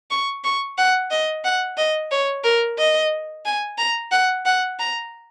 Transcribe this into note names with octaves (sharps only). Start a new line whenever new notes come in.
C#6
C#6
F#5
D#5
F#5
D#5
C#5
A#4
D#5
G#5
A#5
F#5
F#5
A#5